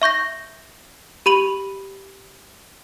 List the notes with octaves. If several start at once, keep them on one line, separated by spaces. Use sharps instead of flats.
E5 C#6 G6 A#6
G4 B5 D#7 F#7